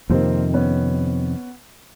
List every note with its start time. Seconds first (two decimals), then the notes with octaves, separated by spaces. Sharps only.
0.10 F2 C3 D#3 A#3 C4
0.54 B3 C#4